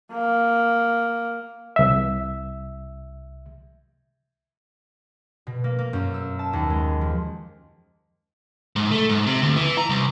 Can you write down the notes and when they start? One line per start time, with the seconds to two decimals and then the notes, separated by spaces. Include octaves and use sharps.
0.13 A#3
1.76 C2 E5
5.47 B2
5.64 A#3
5.79 A#3
5.93 F#2
6.14 E6
6.39 A5
6.53 D#2
6.70 G#3
7.01 F3
8.76 G#2
8.91 A3
9.09 G#2
9.27 C3
9.42 D2
9.56 E3
9.78 A#5
9.90 C2